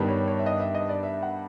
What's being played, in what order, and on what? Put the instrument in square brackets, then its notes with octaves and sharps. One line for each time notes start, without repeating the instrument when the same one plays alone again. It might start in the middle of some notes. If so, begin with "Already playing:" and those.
Already playing: [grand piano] G2 D#3 G3 B3
C#5
C#5
E5
D#5
E5
D#5
D5
E5
F#5